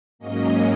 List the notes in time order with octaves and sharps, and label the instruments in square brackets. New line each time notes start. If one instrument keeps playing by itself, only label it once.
[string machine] G#2 F#3 A#3 C#4 D#5